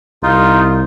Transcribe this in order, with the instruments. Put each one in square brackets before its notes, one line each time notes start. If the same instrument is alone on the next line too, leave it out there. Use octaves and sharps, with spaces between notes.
[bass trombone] C2 [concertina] D#4 F4